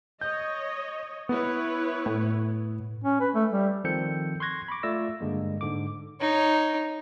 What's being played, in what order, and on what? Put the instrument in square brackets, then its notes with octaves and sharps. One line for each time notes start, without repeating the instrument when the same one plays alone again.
[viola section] C#5 D#5 [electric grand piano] G6
[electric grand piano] B3 [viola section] E4 B4 C#5
[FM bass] A2
[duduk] C#4
B4
A3
G3
[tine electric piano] D#3 F3 C4 A4 G6 C#7
C6 C#6 F#6 G#6 A#6
B5 C#6 D6
A3 F4 D5 E6 A#6
G2 D3 G#3 A#3
G#2 D3 D6
[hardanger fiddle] D#4 C#5